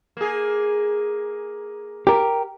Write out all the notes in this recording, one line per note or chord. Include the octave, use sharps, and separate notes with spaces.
A#3 G#4
G4 A#4